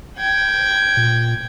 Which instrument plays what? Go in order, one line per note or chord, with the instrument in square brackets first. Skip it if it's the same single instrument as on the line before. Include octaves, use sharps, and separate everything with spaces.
[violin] G5 G#6
[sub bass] A#2